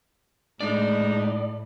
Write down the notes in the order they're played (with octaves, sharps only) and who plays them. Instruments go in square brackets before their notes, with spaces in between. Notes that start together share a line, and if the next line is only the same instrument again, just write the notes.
[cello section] A2 [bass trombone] G#3 [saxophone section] D4 D#4 [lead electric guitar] D5